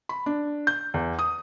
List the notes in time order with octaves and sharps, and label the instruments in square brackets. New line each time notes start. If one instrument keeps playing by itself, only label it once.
[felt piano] B5
D4
G6
E2
D#6